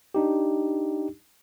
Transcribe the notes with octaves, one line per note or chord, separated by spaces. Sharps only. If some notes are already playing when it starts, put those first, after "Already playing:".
D4 D#4 G4